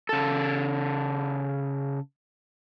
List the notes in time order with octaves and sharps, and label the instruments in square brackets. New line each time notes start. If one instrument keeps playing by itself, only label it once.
[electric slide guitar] C#3 A4